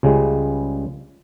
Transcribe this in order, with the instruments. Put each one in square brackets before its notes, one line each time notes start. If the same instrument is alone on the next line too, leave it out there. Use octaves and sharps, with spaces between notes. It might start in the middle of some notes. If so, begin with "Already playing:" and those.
[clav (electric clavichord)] C#2 C#3 G3 G#3